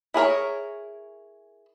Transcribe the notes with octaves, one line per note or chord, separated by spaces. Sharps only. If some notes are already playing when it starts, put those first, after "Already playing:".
E4 G#4 A#4 C#5